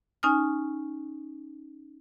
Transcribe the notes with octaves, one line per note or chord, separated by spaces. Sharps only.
C#4 D#4 G#5 D#6 F6